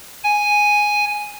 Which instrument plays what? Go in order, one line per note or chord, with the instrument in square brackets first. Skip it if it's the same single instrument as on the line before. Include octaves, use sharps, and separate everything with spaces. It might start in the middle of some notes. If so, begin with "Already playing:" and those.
[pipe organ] G#5